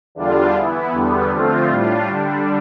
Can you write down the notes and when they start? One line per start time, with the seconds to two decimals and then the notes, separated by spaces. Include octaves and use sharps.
0.15 E2 D3 G3 D4 F4
0.54 E3 B3 E4
0.92 E2 D3 G3 B3
1.30 D3 F3 A3 C4 F4
1.69 A2 G3 D4 F4
2.07 D3 G3 D4